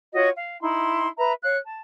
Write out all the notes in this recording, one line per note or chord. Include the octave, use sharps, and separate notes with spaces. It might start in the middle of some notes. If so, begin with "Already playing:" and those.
F4 F#4 C#5 D#5
F5
D#4 E4 C6
B4 E5 A#5
C#5 F5 F#6
A5